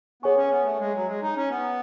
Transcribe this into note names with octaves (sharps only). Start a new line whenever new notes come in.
B3 G#4 C#5 G#5 C#6
C#4
B3
A3
G#3
F#3
G#3
D#4
C#4
B3